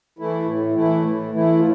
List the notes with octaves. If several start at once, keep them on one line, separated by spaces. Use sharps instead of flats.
E3 A3 E4
A2
E3 A3 E4
A2
E3 A3 E4
A2 F4